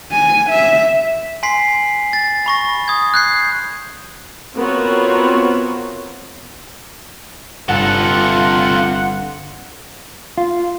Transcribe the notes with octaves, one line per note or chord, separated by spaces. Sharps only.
G#5
E5
G#5 C6 B6 C7
A6
B5 C#6 A#6
D#6 G#6
F#6 G6 C7
B3 C4 F4 F#4 A#4 C#5
G1 C3 F4 A4 F#5
F4